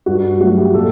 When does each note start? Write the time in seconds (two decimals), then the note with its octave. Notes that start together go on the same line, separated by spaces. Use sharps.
0.06 G2 F#4
0.40 F#3 A3 F#4
0.58 G4
0.74 A#2 A4